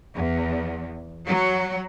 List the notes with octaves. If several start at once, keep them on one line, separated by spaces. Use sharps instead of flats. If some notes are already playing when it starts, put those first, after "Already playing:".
E2
F#3